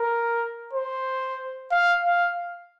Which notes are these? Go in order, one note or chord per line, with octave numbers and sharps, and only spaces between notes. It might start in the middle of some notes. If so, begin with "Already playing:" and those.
Already playing: A#4
C5
F5
F5